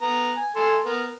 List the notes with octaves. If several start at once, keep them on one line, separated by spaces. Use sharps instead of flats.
B3 A#5
G#5
A4 G#5 C6
B3 A#4